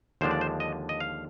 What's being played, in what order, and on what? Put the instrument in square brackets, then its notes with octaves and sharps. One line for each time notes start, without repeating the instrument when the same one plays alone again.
[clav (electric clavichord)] D#2 D3 F3 G#3 D4 C5
D5
C5
D#5
D#5
F5